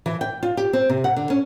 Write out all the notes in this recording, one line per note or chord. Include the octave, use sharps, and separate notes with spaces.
E3
G5
F4
G4
C4
C3
F#5
D3
C#4